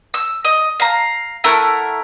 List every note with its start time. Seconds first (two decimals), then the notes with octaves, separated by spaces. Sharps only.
0.14 E6
0.45 D#5
0.80 F5 A#5
1.44 A3 E4 A#4 F#5